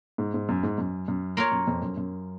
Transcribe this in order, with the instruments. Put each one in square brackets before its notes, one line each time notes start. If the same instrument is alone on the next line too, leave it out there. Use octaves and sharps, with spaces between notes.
[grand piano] G#2
G#2
F#2
G#2
F#2
F#2
[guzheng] A#3 F4 A#4 C#5
[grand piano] F#2
F2
F#2
F#2